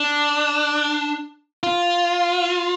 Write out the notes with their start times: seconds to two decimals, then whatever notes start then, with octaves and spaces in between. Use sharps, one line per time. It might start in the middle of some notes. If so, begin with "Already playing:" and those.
Already playing: D4
1.63 F4